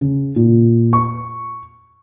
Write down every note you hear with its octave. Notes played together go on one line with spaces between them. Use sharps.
C#3
A#2
C#6